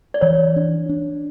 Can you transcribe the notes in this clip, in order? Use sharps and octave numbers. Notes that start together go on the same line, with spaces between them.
D5
E3 C#5
D4
D4